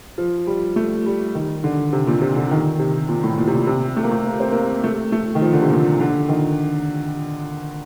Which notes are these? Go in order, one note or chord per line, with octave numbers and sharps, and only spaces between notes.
F3
G3
A3
G3
D#3
D3
C3
A#2
C3
D3
D#3
C3
A#2
A2
A#2
C3
A#2
C3
A3
A#3
A3
A#3
C4
A#3
A3
A3
D#3
F3
D3
C3
A#2
D3
D#3